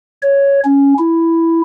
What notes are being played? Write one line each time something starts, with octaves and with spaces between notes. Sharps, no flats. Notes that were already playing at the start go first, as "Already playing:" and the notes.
C#5
C#4
E4